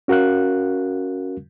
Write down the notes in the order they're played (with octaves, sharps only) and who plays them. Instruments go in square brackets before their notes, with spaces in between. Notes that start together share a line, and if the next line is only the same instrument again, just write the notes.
[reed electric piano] C#4 F#4 A#4 F5 F#6